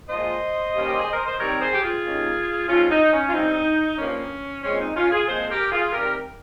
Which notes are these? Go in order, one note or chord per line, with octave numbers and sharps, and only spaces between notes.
A#2 F3 G#3 C5 D#5
D#2 D#3 G3 A#3 C#4
G4
G#4
A#4
C5
C3 D#3 G3 A#4 C#5
G#4 C5
G4
F4 G#4
D#2 D#3 A#3 C#4
G#2 F3 C4 C#4 F4
D#4
C#4
F4
G2 G3 C4 D#4
G2 F3 A#3 C#4
A#2 G#3 C4 C#4
D#4
C#4 F4
F4 G#4
A#2 F3 G#3 C4 G#4 C5
G4 A#4
F4 G#4
C3 D#3 G3 G4 A#4